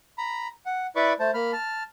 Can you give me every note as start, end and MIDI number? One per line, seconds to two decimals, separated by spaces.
0.18 0.48 82
0.18 0.48 83
0.66 0.87 78
0.96 1.13 64
0.96 1.13 71
0.96 1.13 74
0.96 1.13 83
0.96 1.13 85
0.96 1.13 86
1.20 1.31 57
1.20 1.31 72
1.20 1.31 81
1.34 1.52 58
1.34 1.52 83
1.34 1.52 89
1.53 1.83 81
1.53 1.83 89